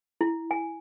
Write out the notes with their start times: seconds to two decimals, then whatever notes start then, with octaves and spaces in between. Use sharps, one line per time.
0.21 E4
0.51 G#5